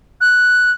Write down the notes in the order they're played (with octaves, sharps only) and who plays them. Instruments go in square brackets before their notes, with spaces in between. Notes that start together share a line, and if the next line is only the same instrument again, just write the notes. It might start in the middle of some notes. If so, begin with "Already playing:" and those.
[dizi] F#6